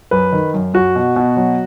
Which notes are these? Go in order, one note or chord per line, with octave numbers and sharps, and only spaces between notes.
F#2 B4
D#3
F#2
F#2 F#4
B2
B2
F#3